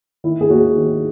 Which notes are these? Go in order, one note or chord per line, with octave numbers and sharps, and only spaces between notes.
D#3 E4
G#4
D#2 F#4
D#3